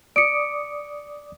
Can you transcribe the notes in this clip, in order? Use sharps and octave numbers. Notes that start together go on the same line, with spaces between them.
D5 D6 D#6 C#7 D7